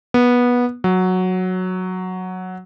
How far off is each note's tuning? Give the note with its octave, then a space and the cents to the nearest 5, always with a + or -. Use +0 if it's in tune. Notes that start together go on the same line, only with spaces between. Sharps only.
B3 -15
F#3 -5